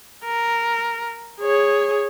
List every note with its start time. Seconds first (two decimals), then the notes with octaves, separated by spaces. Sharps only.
0.24 A#4
1.40 G#4 C#5